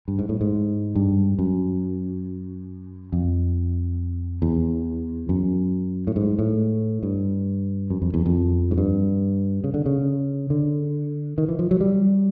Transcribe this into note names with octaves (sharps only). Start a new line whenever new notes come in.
G2
G#2
A2
G#2
G2
F#2
F2
E2
F#2
A2
G#2
A2
G2
F#2
F2
E2
F2
G#2
G2
C#3
D3
C#3
D3
D#3
E3
F3
F#3
G3